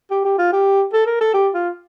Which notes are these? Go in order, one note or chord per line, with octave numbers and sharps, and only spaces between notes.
G4
G4
F4
G4
A4
A#4
A4
G4
F4